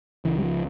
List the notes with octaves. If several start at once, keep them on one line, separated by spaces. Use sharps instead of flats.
C#2 C#3 E3
G3
F3